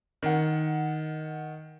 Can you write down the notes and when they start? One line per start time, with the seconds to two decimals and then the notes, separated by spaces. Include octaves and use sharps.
0.23 D#3 F#5